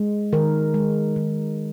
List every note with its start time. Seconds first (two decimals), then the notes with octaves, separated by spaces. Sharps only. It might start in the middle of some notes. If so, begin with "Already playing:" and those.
Already playing: G#3
0.33 D#3 A#4
0.74 G#3
1.16 D#3